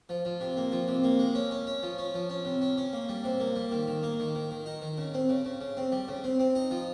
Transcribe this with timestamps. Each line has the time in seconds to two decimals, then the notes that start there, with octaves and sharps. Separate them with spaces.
0.09 F3
0.25 F3
0.40 C3
0.57 A#3
0.72 F3
0.88 C3
1.04 A#3
1.19 G#3
1.35 C#4
1.51 C#4
1.67 C#4
1.83 F3
1.98 C#4
2.14 F3
2.30 C#4
2.45 C3
2.62 C#4
2.77 C#4
2.93 A#3
3.09 G3
3.24 C3
3.40 A#3
3.56 G3
3.72 D#3
3.87 D#3
4.03 A#3
4.20 D#3
4.35 D#3
4.51 D#3
4.66 D#4
4.82 D#3
4.98 C#3
5.14 C4
5.29 C#3
5.45 C#3
5.61 C#3
5.77 C4
5.92 G3
6.08 C#3
6.24 C4
6.40 C4
6.55 D#4
6.71 F3